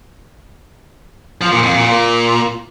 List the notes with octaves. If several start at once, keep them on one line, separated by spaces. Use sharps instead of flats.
F3
A#2
F2
A#2
A#2